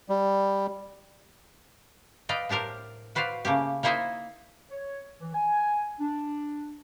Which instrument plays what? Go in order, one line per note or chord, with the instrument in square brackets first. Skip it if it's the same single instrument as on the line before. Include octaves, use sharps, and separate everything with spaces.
[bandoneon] G3
[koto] B4 D5 D#5 F5 G5
A2 D4 G4 A#4 C5
F#4 B4 C5 D5 F5
C#3 A3 A#3 G4
A#3 D#4 E4 C5 D#5 E5
[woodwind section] C#5
E3
G#5
D4